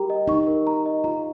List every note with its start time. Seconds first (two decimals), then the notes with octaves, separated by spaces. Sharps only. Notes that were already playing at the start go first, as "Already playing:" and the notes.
Already playing: G4 A#4 A#5
0.10 D#5
0.28 D#4 C#6
0.47 A#4
0.67 A#5
0.86 D#5
1.04 F4 A#5